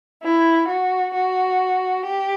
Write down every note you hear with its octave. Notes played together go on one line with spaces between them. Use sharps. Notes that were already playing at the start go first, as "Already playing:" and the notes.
E4
F#4
F#4
G4